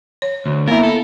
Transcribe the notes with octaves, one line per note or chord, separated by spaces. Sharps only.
C#5
D2
A#3 B3 E4 A#4
A4